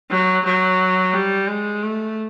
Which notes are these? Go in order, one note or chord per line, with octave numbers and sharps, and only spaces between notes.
F#3
F#3
G3
G#3
A3